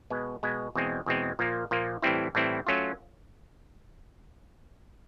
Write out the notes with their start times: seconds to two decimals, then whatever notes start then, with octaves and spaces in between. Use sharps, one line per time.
0.10 B2 G#3 B3
0.43 B2 G#3 B3
0.75 E2 B2 G#3 C4
1.06 E2 B2 G#3 C4
1.39 A#2 F3 A#3
1.71 A#2 F3 A#3
2.02 A2 E3 G3 C4 E4
2.35 A2 E3 G3 C4 E4
2.67 F#3 A3 C#4 F4